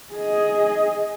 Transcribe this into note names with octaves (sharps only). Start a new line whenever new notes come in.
G#4 D#5